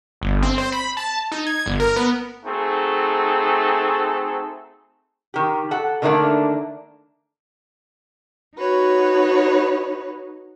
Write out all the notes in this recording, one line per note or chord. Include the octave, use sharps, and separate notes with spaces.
G1
C4
C5
B5
A5
D#4
G#6
G1
A#4
B3
A3 C4 D#4 F#4 G#4 A4
D#3 G4
A4 F#5
D3 D#3 A3 A#3 D4
D#4 F#4 B4 C#5